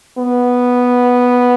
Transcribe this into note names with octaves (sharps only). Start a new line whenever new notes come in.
B3